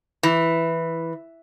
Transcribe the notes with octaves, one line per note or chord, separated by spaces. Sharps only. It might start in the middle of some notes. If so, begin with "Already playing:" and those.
E3